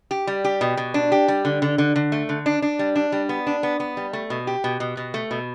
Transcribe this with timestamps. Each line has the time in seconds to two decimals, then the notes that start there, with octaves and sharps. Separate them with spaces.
0.11 G4
0.27 G3
0.44 G4
0.61 B2
0.77 B2
0.94 D4
1.12 G4
1.28 G3
1.45 D3
1.62 D3
1.78 D3
1.96 D3
2.12 A3
2.29 D3
2.46 D4
2.62 D4
2.79 G3
2.96 D4
3.12 G3
3.29 B3
3.47 D4
3.63 B3
3.80 B3
3.97 G3
4.13 A3
4.30 B2
4.47 G4
4.64 B2
4.80 B2
4.97 B2
5.14 A3
5.31 B2